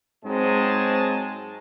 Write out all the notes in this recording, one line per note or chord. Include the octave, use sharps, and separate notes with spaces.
G#2 F#3 G#3 C4 G#5 A5